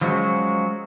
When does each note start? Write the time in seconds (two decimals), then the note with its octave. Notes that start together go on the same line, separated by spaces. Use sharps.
0.01 F3 F#3 G#3 C#4 F#4